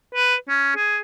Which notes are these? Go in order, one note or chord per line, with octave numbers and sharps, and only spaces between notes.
B4
C#4
G#4